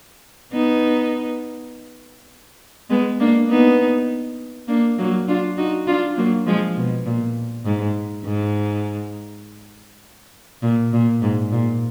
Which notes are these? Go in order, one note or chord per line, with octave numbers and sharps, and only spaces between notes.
B3 D#4
G#3 B3
A#3 D4
B3 D#4
A#3 D4
F#3 A#3
D4 F4
D#4 F#4
D4 F4
F#3 A#3
F3 G#3
B2
A#2
G#2
G#2
A#2
A#2
G#2
A#2